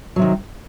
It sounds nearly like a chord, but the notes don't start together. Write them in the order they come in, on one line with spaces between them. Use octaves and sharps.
F#3 C3 D#3